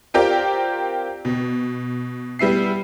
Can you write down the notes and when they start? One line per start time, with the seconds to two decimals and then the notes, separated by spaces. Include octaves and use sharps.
0.14 C4 F4 G4 A#4 D5 G5
1.25 B2
2.39 G3 B3 E4 C7